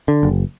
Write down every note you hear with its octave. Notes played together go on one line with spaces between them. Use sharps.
D3
F#1